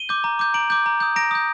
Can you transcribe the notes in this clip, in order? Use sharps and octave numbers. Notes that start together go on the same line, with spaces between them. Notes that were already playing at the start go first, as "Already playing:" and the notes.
Already playing: D#7 G7
D6 G6
A#5
D6 G6
A#5 D7 F#7
D6 G6
A#5
D#6 G6
A#5 A#6 D7
D#6 G6